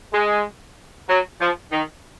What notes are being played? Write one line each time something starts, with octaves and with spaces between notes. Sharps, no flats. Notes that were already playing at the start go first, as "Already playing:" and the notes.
G#3
F#3
F3
D#3